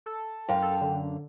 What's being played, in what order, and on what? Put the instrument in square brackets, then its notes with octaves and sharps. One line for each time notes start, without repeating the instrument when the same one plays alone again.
[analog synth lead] A4
[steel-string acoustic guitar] F#2 F5 [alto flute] G5
[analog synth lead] A4
D3